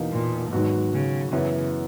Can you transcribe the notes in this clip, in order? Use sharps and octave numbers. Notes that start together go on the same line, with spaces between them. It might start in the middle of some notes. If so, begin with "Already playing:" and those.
Already playing: E2 B2 A#3 D#4
A#2
G#2 D#3 F#3 B3 F#4
C#3
F#2 C#3 E3 B3 E4